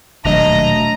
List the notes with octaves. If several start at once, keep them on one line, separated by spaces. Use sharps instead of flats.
D#1 B2 F#3 A3 D4 D#5 A#5